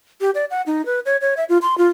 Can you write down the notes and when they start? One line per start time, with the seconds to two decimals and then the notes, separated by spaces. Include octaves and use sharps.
0.21 G4
0.35 D5
0.51 F#5
0.66 D#4
0.86 B4
1.06 C#5
1.21 C#5
1.37 E5
1.49 F4
1.62 C6
1.78 F4